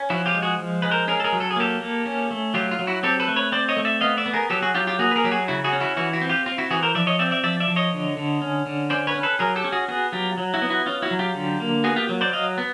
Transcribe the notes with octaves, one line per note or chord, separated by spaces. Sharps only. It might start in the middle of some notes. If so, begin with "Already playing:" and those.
Already playing: C#4
F3 E4 F#4
F4 G4
G#3
F#4 G#4
F3
G#3 B4
A#4 C5
C#4 G#4 A#4
A4
G#4 A#4
F#3
A4
G#4
A#3 G4 A4
A#3
C#4
A3
F#3 F4 G4
F4
F#3
E4 F#4
C4 G4 A4
A4 B4
A3
B4 C#5
C4 C5 D5
C#5 D#5
A3
D5 E5
B3 D#5 F5
D5 E5
B3
G#4 A#4
F#3 G4 A4
F#4 G#4
F#3 F4 G4
F4 G4
A#3 F#4 G#4
B4
G#4 A#4
F#3 G4
F#4 G#4
C#3 E4 F#4
F#4 G#4
C#4
E4 F#4
E3 E4 F#4
E4 F#4
C4
F4 G4
C4 F4
E4 F#4
E3 F#4 G#4
A#4 C5
F3 D5 E5
C#5 D#5
C4 D5 E5
D5 E5
F3 D5 E5
D5 E5
F3
C#5 D#5
D3
D3
C#4
D3
C#4 C5 D5
B4 C#5
C#4
A4 B4
F#3 G#4 A#4
G4 A4
C#4
F#4 G#4
B3 F#4 G#4
F#3 F4 G4
F#3
E4 F#4
B3
E4 F#4
C#4 F4
E4 F#4
F#3
F4 G4
D3
A#3
B3 F#4 G#4
F4 G4
F#3
C5 D5
F#3 D#5 F5
B3